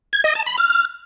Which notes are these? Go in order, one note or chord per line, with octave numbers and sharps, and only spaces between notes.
G#6
D#5
A5
B5
F6